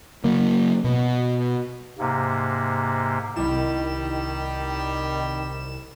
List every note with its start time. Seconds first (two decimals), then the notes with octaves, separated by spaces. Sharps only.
0.24 C#3 F#3 A#3
0.84 B2
1.99 G#2 C3 A#3
3.36 C2 D#3 G3 E4 E7